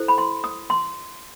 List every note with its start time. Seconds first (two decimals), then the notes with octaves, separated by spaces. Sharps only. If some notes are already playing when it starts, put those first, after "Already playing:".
Already playing: E4 A4 C5
0.08 B5
0.18 C6
0.44 D#6
0.70 C6